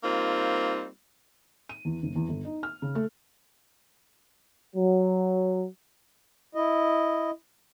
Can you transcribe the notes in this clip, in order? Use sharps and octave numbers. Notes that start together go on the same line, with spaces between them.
G3 A#3 C4 D#4 F4
D#7
E2
F#1
E2
G1
D#4
F6
C#3
A3
F#3
E4 D#5